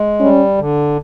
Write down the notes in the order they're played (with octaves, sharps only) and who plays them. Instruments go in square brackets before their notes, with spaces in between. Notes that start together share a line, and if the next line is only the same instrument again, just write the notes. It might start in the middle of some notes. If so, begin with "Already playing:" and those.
Already playing: [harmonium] G#3
[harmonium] G3 [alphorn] C#4
[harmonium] D3